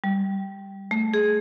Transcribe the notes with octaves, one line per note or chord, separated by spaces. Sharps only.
G3
A3
G#4